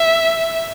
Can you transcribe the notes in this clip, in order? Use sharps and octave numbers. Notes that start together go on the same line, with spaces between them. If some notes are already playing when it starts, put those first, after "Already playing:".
Already playing: E5